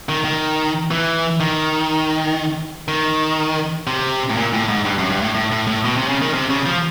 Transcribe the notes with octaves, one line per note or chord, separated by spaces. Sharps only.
D#3
D#3
E3
D#3
D#3
C3
A2
A#2
A2
G#2
G2
F#2
G2
A2
A2
A2
A2
B2
C3
C#3
D#3
C3
C#3
F3